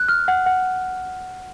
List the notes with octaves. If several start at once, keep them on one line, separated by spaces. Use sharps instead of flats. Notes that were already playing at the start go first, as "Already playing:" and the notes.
Already playing: F#6
F6
F#5
F#5